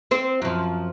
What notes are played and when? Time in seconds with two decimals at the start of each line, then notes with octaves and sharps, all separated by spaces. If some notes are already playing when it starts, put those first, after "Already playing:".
0.11 C4 C5
0.42 F#2 F3